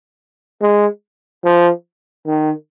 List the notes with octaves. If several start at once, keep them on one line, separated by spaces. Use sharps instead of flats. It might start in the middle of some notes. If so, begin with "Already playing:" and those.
G#3
F3
D#3